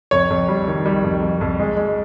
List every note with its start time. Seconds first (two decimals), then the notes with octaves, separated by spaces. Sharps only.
0.11 F2 C#5
0.30 F2
0.48 G3
0.68 D#3
0.86 G3
1.04 F2
1.22 F2
1.41 F2
1.60 G#3
1.77 G#3